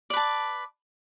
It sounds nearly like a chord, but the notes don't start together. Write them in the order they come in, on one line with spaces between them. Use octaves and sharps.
D5 B4 A5